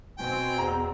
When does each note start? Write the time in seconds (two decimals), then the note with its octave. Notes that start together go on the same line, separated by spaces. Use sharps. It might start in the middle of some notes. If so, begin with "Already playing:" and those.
0.18 B2 C4 G5 G#5
0.58 E2 A#5